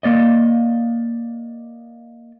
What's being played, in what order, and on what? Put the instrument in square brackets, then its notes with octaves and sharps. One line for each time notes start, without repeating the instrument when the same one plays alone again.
[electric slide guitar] A#3 D5 D#5